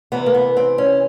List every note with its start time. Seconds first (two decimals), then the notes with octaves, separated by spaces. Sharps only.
0.12 C3 E3 B3
0.26 A#3
0.35 B3
0.57 C4
0.78 C#4